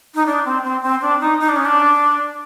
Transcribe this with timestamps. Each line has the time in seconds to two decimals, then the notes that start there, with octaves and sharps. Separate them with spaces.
0.15 D#4
0.26 D4
0.45 C4
0.63 C4
0.82 C4
1.01 D4
1.21 D#4
1.40 D#4
1.49 D4
1.56 C#4
1.65 D4